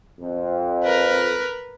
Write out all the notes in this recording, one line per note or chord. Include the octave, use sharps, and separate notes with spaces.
F2
A#4 B4